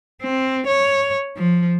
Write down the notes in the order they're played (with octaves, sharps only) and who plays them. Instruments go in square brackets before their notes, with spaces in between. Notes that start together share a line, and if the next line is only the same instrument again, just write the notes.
[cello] C4
C#5
F3